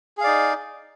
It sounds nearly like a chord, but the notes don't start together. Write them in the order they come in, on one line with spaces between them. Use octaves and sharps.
G#4 F5 D5 D#4